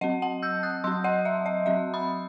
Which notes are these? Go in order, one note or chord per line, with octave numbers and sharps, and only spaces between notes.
F#3 C4 D#5 F#5
F#5 A5
E6 G6
D#6 F#6
F#3 C4 C6 E6
D#5 F#5
E5
D#5
F#3 C4 E5
B5 D#6